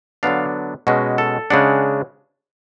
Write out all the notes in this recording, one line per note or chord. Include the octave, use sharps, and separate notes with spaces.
D3 F#3 B3 D4 F5
B2 G#3 C#4 F#4
A4
C#3 G#3 D4 F#5